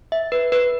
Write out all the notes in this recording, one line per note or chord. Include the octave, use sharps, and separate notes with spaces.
E5
B4
B4